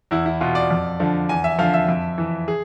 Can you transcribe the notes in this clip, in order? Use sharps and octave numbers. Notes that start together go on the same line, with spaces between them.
E2 E4
E4
B2 F4
D5
F2
D3 F3
E2 G#5
E5
D3 F3 F5
E5
F2
E3
G#4